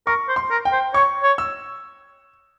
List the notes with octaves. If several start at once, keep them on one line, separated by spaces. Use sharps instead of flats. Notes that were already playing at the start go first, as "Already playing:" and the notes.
A#4 C#6
C5
C6
A#4
G5
C5
C#5 C#6
C#5
E6